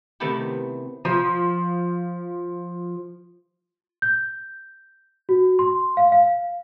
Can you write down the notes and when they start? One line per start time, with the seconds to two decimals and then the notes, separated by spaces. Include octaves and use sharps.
0.20 C3 D#3 A3 B3 E4 G4
1.05 F3 F4
4.02 G6
5.29 F#4
5.59 C6
5.97 F5
6.12 F5